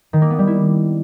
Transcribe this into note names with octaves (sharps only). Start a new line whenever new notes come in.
D#3
A#3
B3
G3
E4